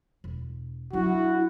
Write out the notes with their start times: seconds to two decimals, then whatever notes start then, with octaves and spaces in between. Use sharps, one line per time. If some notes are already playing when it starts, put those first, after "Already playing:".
0.24 E1
0.93 F#3 D4 E4 F#4